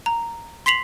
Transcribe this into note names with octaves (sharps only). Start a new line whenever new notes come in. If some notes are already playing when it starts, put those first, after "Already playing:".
A#5
C6 B6 C7 F7 F#7